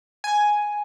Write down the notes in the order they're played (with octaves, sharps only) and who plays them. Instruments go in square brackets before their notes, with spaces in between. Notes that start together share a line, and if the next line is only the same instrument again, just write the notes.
[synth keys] G#5